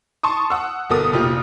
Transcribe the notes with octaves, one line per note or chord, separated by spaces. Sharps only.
A5 C6 C#6 D#6
F#5 E6
G1 B2 A4 A#4 D#6
F1 A#1 F4 G4 F6